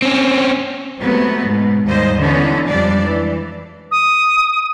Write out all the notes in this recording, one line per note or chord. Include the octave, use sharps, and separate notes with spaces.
C4 C#4
C3 F#3 G#3 A3 B3
G#2 B2
D#2 G#2 G3 C5 D#5
D3 E3 B3 C#4 D#4
F2 G3 G#3 D4 D5
E3
D#6